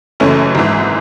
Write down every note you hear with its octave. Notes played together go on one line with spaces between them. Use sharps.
F#1 F#2 E3 A3 C#4
G#1 G#2 E3